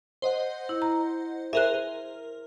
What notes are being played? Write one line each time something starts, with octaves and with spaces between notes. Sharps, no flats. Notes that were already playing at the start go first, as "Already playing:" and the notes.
C5 D#5 F#5
E4
A#5
G#4 A#4 C5 E5 F#6
A#4